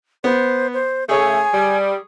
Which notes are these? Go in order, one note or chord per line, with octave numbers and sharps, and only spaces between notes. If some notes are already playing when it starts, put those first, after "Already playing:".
B3 C5
C5
C#3 A3 G#4 C#5 G#5
G3